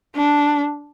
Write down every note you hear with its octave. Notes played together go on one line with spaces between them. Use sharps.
D4